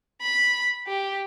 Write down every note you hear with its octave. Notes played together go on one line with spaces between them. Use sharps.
B5
G4